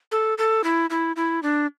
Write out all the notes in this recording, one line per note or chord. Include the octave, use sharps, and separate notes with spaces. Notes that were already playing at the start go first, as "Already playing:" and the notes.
A4
A4
E4
E4
E4
D4